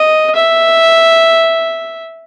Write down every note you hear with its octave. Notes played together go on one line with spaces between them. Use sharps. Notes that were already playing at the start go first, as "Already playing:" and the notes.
Already playing: D#5
E5